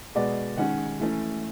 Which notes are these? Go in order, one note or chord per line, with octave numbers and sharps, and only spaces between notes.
B2 G#3 B3 D5
D#3 G#3 C#4 F#5
E3 A3 C#4